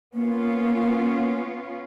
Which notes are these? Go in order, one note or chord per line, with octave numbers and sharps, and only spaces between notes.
A#3 B3 C#4 F4